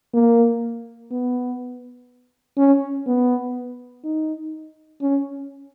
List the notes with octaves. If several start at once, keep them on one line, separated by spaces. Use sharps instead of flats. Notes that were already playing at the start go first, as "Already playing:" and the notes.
A#3
B3
C#4
B3
D#4
C#4